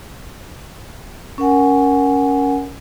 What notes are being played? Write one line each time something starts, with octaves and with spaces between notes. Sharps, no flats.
C#4 A#4 F#5 G#5